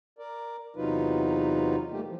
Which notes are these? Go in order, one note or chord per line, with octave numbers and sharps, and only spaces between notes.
A#4 D5
E2 C3 F#3 D#4 F4 B4
G3 A3 A#3 G4
E3 F3